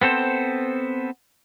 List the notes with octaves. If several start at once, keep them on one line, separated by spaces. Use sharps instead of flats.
B3 C4 A4 C5